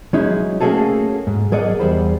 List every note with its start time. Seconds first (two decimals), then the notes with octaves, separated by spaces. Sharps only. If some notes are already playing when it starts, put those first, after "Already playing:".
0.13 F#3 G#3 C#4 D#4 E4
0.61 A3 A#3 C#4 F#4 G#4 A4
1.27 G#2
1.52 F#3 G#4 A#4 D5 D#5 F#5
1.80 E2 G3 C5 B5